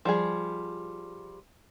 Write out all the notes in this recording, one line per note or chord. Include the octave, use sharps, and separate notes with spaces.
F3 G3 G#4